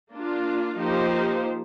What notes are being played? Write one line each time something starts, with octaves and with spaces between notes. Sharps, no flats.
A#3 D4 F4
F3 A#3 D#4 G4 C5